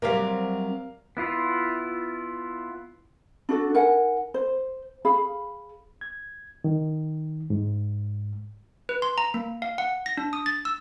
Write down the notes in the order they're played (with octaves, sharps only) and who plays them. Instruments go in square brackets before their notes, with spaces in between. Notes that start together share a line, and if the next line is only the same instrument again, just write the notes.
[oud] C3 F#3 G3 [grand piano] A#4 F5
[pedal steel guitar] B3 E4 F4
[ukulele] D4 F#4 A4
D#4 A#4 F#5 G#5
C5
G#4 F5 B5
[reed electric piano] G#6
D#3
G#2
[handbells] B4
C6
A#5
A#3
F5
F#5
A#6
D4
D#6
A6
E6